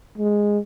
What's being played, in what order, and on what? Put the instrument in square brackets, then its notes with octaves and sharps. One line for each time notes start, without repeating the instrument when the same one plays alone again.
[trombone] G#3